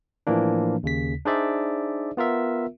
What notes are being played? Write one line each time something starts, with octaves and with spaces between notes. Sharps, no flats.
A2 E3 F3 A#3 D4
D#2 C#3 B6
D4 D#4 G#4 C5 D5 E5
B3 F4 A#4 E5